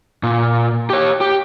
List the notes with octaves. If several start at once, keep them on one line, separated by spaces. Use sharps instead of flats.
A#2
G4 C#5
G4